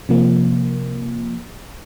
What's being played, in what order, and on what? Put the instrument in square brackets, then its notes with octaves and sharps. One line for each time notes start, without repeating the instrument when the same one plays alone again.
[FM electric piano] C3 F3 A#3